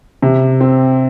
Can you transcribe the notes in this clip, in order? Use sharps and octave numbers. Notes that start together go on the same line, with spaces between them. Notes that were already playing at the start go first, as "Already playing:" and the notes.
C3
C4